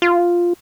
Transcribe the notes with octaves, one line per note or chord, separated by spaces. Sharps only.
F4